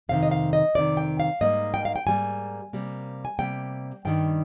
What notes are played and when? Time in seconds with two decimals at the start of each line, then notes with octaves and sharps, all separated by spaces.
0.09 F2 C3 D#3 F5
0.23 D#5
0.31 F5
0.53 D#5
0.75 F2 C3 D#3 D5
0.97 G5
1.20 F5
1.41 G#2 G3 A#3 D#5
1.74 G5
1.85 F5
1.96 G5
2.07 G#2 G3 A#3 G#5
2.73 C3 G3 A#3
3.25 G#5
3.39 C3 G3 A#3 G5
4.05 G2 D#3 G3 G5